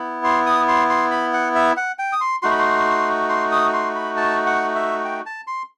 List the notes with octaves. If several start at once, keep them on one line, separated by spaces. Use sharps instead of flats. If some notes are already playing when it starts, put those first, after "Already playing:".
Already playing: B3 E4
C6
D#6
C6
C6
B5
F#5
E5
F#5
G5
D#6
C6
A3 D#4 F#4 C6
B5
C6
C6
D#6
C6
B5
A5
F#5
E5
G5
A5
C6